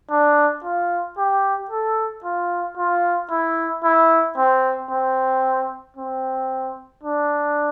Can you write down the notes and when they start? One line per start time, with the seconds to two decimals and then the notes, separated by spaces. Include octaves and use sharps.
0.10 D4
0.64 F4
1.18 G4
1.70 A4
2.24 F4
2.77 F4
3.30 E4
3.84 E4
4.37 C4
4.90 C4
5.96 C4
7.03 D4